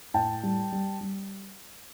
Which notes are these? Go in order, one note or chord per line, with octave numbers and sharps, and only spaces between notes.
A2 G5 A5
G3
G3
G3